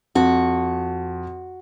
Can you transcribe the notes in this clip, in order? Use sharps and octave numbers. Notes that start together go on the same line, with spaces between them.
F2 F#4